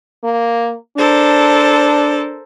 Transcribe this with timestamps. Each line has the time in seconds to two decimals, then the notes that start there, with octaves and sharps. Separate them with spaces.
0.24 A#3
0.98 D4 A4 A#4 C5